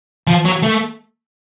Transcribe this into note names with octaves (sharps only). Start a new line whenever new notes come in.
F3
F#3
A3